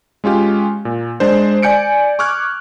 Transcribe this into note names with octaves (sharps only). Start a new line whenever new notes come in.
G#3 C#4 F4 G4
A#2
G#3 D4 C5
D5 G#5 G6 C#7 D7
C#6 D6 F6 F#6 G#6